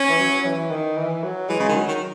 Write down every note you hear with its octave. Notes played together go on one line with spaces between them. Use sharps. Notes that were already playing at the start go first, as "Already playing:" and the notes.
Already playing: C#4
E3
F#3
E3
D#3
E3
F#3
E3 G#3
C#3
D#3
F#3
D#3